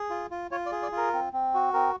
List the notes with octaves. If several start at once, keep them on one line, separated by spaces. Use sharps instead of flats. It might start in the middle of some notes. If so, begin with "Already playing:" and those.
Already playing: G#4
F4
F4
F4 C#5
D5
G#4
D5
F4
A#4
C4
C4
F#4
C4 A#4